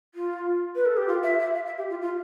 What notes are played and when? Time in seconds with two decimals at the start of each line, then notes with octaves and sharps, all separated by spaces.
0.14 F4
0.75 B4
0.85 A4
0.97 G4
1.08 F4
1.23 E5
1.39 E5
1.54 F5
1.65 E5
1.77 G4
1.90 F4
2.01 F4